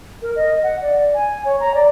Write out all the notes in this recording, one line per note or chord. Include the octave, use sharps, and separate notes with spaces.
A#4
D#5
F#5
D5
G#5
C#5
A#5
D5